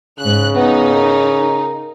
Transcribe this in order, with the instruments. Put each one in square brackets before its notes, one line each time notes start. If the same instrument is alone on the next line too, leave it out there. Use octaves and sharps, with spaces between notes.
[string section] G#2 F#6 [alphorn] C#3
[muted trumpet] B3 [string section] D#4
[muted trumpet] A#4